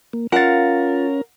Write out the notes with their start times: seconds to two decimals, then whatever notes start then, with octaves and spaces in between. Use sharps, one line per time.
0.13 A#3
0.32 C#4 F4 A#4 F5 F#5 A6